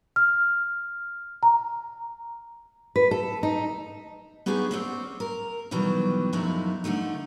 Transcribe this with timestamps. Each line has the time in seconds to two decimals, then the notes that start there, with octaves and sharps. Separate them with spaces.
0.16 F6
1.43 A#5
2.96 B4
3.11 A4
3.43 D#4
4.46 B3 C#4 D#4 G4 G#4
4.71 C4 C#4 D5
5.20 A#4
5.71 B2 D#3 E3 F#3 G3
6.33 F#2 A2 F3 G#3 D#4 E4
6.84 D3 F3 A3 D#4